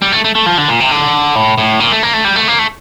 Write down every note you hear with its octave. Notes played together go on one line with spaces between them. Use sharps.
G3
A3
A3
A3
F3
D3
A#2
C3
D3
A2
A2
A#2
A3
A#3
A3
G3
A3
A#3
A3